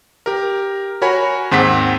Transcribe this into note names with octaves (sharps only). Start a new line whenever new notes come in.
G4 A#4
F#4 A#4 C#5 G#5 B5
D#2 G#2 C4 F#5 B6